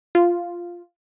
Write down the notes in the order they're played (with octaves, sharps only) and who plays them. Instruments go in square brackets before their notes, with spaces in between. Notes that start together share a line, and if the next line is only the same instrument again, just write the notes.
[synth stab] F4